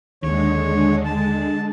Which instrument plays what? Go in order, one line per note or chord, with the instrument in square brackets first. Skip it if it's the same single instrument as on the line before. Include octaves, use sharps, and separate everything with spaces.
[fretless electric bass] D#2 [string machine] D3 G#3 [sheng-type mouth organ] C#5
[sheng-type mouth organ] A5